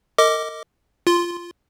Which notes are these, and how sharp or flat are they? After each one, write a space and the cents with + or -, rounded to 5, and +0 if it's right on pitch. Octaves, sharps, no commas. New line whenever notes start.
A#4 -35 D#5 +15 D6 +0
F4 -10 C6 +0